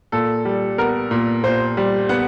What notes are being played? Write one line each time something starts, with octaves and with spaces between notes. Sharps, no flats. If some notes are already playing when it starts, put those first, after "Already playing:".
A#2 A4
G3
B3 A#4
A#2
A#2 C5
G3
B3 F#5